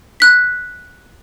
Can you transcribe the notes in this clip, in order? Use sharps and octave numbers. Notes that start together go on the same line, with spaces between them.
F#6 B6